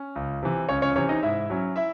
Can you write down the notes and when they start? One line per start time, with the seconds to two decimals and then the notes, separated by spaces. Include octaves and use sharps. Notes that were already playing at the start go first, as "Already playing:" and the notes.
Already playing: C#4
0.16 C#2
0.43 C3 E3
0.69 C#2 C#4 C#5
0.82 C#4 C#5
0.95 C3 E3 C#4 C#5
1.09 D#4 D#5
1.22 G#2 E4 E5
1.50 F#3 C#4
1.76 E4 E5